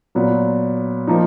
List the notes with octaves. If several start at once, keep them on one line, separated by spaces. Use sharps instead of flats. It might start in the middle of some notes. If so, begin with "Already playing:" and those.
A#2 F#3 B3
F3 A#3 D#4